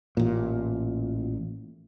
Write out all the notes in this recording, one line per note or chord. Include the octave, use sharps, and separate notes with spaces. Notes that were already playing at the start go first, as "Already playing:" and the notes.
A1 A#2